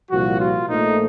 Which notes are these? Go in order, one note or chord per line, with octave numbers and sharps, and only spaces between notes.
C2 A#2 F3 F#4
F4
A#1 A#2 F3 A3 D#4